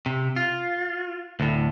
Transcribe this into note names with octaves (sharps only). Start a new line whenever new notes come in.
C3
F4
D2 A2